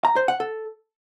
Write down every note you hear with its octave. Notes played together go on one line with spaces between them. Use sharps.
A#5
C5
F#5
A4